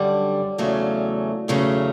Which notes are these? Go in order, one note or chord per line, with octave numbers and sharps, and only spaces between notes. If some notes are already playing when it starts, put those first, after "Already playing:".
Already playing: F#2 D3 G3 D4 D5 F#5
E2 C#3 F#3 A3
E2 C#3 F#3 A3